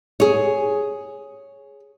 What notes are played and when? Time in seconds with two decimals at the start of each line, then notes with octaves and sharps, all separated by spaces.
0.20 G#4 C#5